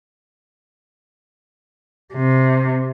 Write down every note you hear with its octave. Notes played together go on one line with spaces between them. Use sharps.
C3